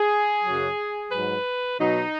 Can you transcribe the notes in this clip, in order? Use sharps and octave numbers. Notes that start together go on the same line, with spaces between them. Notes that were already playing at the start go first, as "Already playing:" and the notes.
Already playing: G#4
F#2 C#3 F#3
G#2 F#3 B4
B2 F#3 D#4